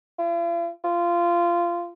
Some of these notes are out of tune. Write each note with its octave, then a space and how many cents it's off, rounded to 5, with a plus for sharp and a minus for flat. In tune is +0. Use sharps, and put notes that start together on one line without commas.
F4 -45
F4 -15